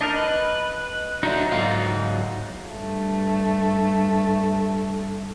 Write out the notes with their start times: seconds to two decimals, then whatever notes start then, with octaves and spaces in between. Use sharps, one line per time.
0.01 D4 D#4 A#4 D#5
0.16 B4
1.23 F#3 D4 D#4 F#4
1.52 G#2 F4 F5
2.71 G2 A3